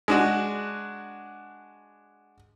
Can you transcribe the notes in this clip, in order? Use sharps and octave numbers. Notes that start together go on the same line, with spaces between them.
G#3 D4 F#4